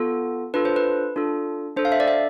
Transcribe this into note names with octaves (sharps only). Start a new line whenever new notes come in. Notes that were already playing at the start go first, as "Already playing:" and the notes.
Already playing: B3 F4 A4
D4 F4 A4 B4
C5
B4
D4 F4 A4
D4 A4 C5
F5
E5
D5
E5